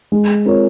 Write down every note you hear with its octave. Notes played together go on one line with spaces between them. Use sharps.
G#3
C4 F4 A#4 C#5